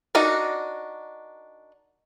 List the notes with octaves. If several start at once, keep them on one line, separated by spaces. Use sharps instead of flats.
D4 D#4 F#4 A#4 D5